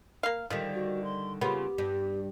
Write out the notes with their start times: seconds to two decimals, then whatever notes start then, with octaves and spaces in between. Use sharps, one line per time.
0.23 A#3 F5
0.50 D3 D#3 F3 G3
0.74 F#4
1.04 C6
1.41 C#3 A#3 B3 F4 G4
1.78 G2